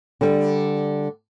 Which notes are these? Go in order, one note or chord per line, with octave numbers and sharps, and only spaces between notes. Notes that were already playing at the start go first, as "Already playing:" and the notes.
D3 G3